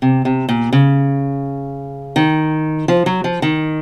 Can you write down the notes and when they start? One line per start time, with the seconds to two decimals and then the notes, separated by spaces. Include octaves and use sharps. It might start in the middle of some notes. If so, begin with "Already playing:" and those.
0.02 C3
0.25 C3
0.49 A#2
0.73 C#3
2.16 D#3
2.88 F3
3.06 F#3
3.24 F3
3.42 D#3